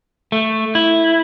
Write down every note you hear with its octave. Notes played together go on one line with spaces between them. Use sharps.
A3
E4